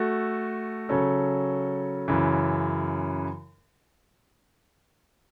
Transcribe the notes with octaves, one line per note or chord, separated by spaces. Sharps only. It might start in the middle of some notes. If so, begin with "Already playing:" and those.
Already playing: A3 F#4 A4
C#3 F#3 C#4 A4
F#2 C#3 E3